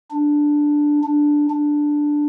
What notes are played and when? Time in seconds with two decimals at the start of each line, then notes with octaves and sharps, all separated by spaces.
0.11 D4
1.04 D4
1.50 D4